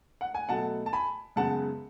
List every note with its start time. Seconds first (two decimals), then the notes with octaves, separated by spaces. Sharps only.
0.21 F#5
0.34 G#5
0.49 B2 F#3 A3 F#5 A5
0.86 A5
0.93 G#5 B5
1.36 F#2 C#3 G#3 B3 F#5 A5